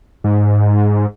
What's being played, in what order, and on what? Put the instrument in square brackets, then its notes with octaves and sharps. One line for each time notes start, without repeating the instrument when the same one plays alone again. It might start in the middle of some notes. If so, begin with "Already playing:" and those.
[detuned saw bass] G#2